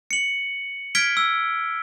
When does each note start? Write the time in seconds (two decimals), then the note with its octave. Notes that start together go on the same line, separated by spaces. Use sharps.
0.11 C#7 F#7
0.95 F6 G#6 B6 D7 G7
1.17 E6